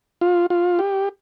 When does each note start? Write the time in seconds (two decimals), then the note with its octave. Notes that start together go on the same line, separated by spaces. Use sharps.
0.21 F4
0.50 F4
0.79 G4